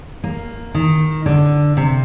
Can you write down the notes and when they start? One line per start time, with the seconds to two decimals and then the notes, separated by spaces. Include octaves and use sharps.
0.24 A#3
0.75 D#3
1.26 D3
1.77 C3